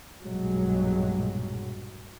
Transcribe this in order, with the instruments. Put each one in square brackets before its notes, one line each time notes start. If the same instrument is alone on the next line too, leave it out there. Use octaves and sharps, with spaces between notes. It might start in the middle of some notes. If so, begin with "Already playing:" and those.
[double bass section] B1 G2 A#2 F#3 G#3